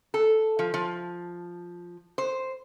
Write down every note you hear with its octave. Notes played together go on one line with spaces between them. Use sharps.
A4
F3
F3
C5